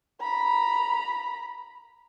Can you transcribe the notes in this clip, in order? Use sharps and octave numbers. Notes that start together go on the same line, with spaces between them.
A#5 B5